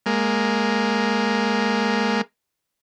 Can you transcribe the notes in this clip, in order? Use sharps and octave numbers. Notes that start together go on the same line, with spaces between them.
G#3 A#3